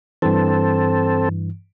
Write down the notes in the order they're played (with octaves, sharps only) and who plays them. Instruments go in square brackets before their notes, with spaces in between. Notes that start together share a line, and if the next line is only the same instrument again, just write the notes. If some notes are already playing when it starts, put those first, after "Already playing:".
[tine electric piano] G2 E3 [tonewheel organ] C4 A4